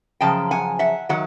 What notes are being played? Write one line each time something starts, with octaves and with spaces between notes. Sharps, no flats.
F#2 C#3 F3 G5 A5
F#5 G#5
E5 F#5
D#3 F#3 F#5